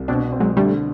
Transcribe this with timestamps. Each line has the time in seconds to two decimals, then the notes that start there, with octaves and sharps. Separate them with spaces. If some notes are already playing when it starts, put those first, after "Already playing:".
Already playing: C2
0.08 B2 C4 D4
0.32 C4
0.40 F#3 G#3
0.57 D3 G3 A3